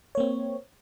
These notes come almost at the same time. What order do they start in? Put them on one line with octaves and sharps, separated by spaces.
C#5 A#3 C4